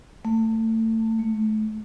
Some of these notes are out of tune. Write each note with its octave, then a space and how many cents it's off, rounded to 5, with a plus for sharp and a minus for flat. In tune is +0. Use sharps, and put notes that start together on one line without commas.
A3 +30
A3 -30